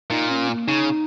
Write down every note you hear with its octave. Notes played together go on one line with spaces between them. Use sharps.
A#2 D#4
C#4
A#3
C#3 D#4